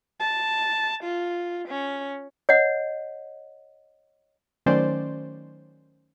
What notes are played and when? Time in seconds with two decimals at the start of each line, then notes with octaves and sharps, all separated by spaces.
0.20 A5
1.04 F4
1.68 C#4
2.49 C#5 D#5 F#5
4.66 D#3 F#3 A3 C#4 C5 D5